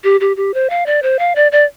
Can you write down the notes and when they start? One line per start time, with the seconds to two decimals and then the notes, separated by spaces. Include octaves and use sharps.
0.04 G4
0.21 G4
0.37 G4
0.54 C5
0.70 F5
0.86 D5
1.03 C5
1.19 F5
1.35 D5
1.52 D5